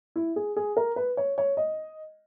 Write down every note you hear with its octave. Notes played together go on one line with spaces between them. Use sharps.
E4
G#4
G#4
A#4
B4
C#5
C#5
D#5